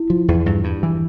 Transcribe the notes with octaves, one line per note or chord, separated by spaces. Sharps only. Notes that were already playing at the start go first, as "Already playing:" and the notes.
Already playing: E4
F3
E2
G2
G2
E3